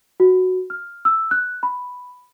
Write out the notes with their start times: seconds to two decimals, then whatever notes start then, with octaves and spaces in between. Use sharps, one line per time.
0.20 F#4
0.70 F6
1.05 E6
1.31 F#6
1.63 B5